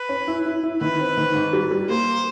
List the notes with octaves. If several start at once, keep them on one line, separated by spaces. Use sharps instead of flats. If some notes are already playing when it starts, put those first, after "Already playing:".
Already playing: B4
C#4
E4
E4
E4
D#3 B4
C4
D#3
G#2
G3
G3
A#3 C5